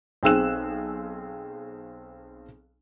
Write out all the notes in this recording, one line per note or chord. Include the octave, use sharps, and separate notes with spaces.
B1 C4 G#4 E6 F#6 E7